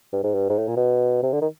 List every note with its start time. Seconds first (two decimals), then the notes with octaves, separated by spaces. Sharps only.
0.13 G2
0.24 G#2
0.35 G2
0.50 G#2
0.58 A2
0.68 A#2
0.77 B2
1.23 C3
1.33 D3
1.42 D#3